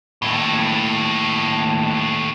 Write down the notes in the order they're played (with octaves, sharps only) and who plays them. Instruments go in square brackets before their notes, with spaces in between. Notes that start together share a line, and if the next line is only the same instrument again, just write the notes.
[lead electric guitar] D#2 A2